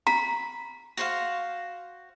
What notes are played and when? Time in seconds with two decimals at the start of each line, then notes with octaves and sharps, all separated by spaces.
0.07 A#5 B5
0.97 F#4 C5 F5